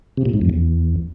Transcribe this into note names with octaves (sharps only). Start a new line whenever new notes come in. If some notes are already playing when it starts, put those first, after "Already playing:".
C3
A#2
G#2
F2
E2